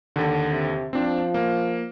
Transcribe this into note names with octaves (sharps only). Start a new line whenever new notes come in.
D#2 D3
C3
F3 C4 D4
A#3